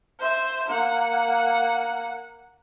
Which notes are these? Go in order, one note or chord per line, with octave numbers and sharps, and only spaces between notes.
C5 E5
A#3 F#5